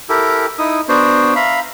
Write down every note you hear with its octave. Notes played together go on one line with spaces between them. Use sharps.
E4 G4 A4 A#4
D#4 E4 D#6
B3 D4 F#4 C5
E5 F5 A#5 B5